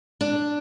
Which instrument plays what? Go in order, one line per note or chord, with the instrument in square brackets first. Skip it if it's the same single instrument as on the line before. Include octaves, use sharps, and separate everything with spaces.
[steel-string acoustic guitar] D4